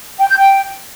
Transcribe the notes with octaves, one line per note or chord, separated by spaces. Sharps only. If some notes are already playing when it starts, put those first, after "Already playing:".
G5
G6
G5